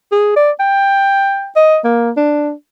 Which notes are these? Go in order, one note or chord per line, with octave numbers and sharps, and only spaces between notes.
G#4
D5
G5
D#5
A#3
D4